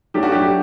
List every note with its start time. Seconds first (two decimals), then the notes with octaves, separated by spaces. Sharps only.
0.14 F#3 A3 D4 G4
0.23 F#4
0.32 G4